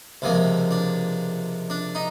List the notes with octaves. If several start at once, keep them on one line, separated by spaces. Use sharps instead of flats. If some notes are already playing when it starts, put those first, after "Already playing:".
C#2 C3 F3 A#3
D4
D4
D#4